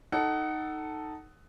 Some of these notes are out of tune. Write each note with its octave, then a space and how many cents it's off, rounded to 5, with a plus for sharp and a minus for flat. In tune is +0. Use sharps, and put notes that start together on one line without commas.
D#4 +0 A4 +0 F#5 +20